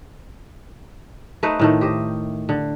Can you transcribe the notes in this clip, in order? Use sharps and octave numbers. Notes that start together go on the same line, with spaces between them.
A3 D#4 B4 C5
A2 D#3 A3
G4 C5 D#5
D3